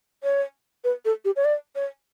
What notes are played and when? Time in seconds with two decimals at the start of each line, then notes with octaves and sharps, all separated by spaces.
0.23 C#5
0.84 B4
1.05 A4
1.25 G4
1.36 C#5
1.45 D5
1.75 C#5